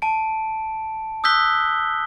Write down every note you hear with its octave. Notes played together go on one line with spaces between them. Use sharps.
A5 D7
D#6 E6 F#6 G6 B6 G7